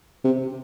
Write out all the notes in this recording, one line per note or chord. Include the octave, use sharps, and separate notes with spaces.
C3